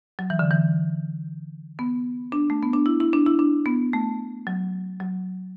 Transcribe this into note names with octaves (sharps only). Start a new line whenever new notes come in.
F#3
E3
D3
E3
B3
D4
A3
B3
D4
E4
E4
D4
E4
D4
B3
A3
F#3
F#3